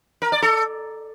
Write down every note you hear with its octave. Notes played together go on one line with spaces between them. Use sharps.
A#4
D5
A4